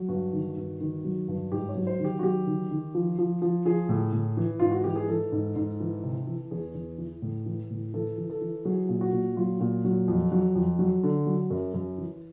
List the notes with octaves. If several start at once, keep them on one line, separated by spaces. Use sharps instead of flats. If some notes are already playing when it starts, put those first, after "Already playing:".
Already playing: F#3
G2 F#4
D#3
G2
D#3
F#3
G2
G#2 G4
C#5
F#3
C5
D#3 G4
F#4
F#3 G4
D#3
D#3
F3
F3
F3
F3 G#4
A2
A2
E3
G#2 F4
F#4
E3 G4
G#4
E3 A4
G#2
G#2
E3
C3
E3
E2 G#4
E2
E3
A2
E3
A2
E3 A4
E3
A4
E3
F#3 G#4
A#2
F#4
A#2
F#3 F4
A#2
F#3
F2
F#3
F2
F#3
D3
F#3
F#2
F#2
E3